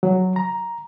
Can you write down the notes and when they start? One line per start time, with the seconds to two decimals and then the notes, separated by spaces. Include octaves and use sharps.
0.03 F#3
0.36 A#5